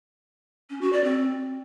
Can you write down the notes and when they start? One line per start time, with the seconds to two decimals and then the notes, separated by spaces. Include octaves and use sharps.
0.70 C#4
0.81 F#4
0.93 D5
1.04 C4